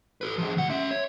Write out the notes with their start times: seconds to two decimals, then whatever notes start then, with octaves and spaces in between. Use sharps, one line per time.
0.21 A4 B4
0.38 F3 G#4
0.57 D2 F#5
0.70 C#4 E5
0.91 C#5